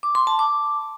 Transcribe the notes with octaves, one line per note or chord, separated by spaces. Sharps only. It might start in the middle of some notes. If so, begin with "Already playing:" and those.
D6
C6
A5
D6